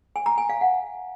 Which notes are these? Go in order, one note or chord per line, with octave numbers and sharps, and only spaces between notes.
G#5
A#5
G#5
F5
F#5